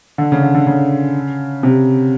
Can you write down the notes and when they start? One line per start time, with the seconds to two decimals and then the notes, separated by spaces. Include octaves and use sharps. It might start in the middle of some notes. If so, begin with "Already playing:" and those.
0.18 D3
0.32 C#3
0.43 D3
0.55 D3
0.67 C#3
1.63 C3